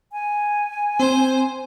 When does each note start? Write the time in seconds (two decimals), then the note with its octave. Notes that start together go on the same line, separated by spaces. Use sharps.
0.12 G#5
1.00 C4 C5